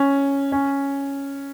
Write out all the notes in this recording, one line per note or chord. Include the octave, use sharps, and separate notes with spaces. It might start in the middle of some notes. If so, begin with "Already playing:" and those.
Already playing: C#4
C#4